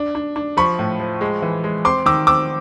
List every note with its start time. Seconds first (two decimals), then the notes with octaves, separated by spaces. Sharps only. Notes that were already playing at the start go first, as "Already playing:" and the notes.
Already playing: D4
0.15 D4
0.36 D4
0.57 F3 B5 C#6
0.79 A2
1.00 F3
1.21 G#3
1.42 E3
1.64 G#3
1.85 C4 C6 D6
2.06 D#3 D6 E6
2.27 C4 D6 E6